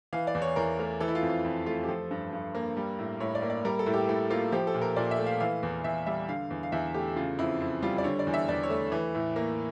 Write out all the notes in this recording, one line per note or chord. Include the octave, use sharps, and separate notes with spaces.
E3 F5
D5
E2
C#5
E2 A#4
A3 A#4
E3 A4
E4
F4
F2
F4
F2
A3 F4
G4
F3 A4
G2
G2
A#3
G3
A2
A2 C#5
D5
A#3
D5
G3 A#4
A4
A2
G4
A2 A4
A#3 F4
F3 G4
A4
A#2
A#4
A#2 D5
E5
A3
F5
E3 F5
E2
E2 E5
G3 E5
D3 F5
E2
F5
E2 E5
A3 G4
C#3 F4
F2 E4
F2
G3 F4
D5
D3 C#5
D5
E2
E5
E2 D5
C#5
A3
E3
A2
A#3